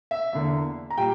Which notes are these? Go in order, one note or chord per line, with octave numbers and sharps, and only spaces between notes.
E5
E2 D3 A#3
A#5
A#2 G3 G5